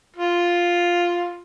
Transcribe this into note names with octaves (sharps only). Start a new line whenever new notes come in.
F4